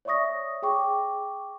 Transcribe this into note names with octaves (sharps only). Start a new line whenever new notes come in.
C#5 D5 E5 C#6 D#6 A#6
G#4 G5 C#6 D6